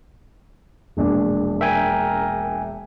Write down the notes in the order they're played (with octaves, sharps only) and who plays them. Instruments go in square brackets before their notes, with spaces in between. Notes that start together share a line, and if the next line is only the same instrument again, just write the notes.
[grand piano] E1 A#1 D4
[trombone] A#4 [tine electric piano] E5 G5 G#5